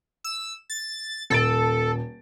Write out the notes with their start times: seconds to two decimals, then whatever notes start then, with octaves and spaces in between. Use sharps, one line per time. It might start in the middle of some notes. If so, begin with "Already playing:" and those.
0.24 E6
0.70 A6
1.30 D#1 A4 A6 D7